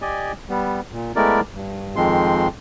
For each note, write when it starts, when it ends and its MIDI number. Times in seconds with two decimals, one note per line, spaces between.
0.02 0.32 67
0.02 0.32 74
0.02 0.32 75
0.02 0.32 80
0.50 0.80 55
0.50 0.80 59
0.93 1.12 46
1.16 1.41 56
1.16 1.41 57
1.16 1.41 59
1.16 1.41 64
1.16 1.41 70
1.16 1.41 74
1.54 1.96 43
1.96 2.48 41
1.96 2.48 51
1.96 2.48 53
1.96 2.48 56
1.96 2.48 60
1.96 2.48 84